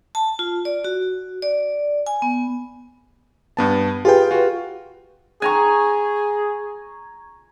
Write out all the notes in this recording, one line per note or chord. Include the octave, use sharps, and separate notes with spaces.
A5
F4
D5
F#4
D5
G#5
B3
G2 B3 A5
F4 G4 G#4 B4 G5
F4 F#4
G#4 G#5 A#5 C#6